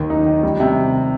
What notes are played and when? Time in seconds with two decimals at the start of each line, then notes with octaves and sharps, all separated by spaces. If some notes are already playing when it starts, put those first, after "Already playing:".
Already playing: D#2 D#3
0.10 D#4
0.26 D#3
0.43 G3
0.60 C3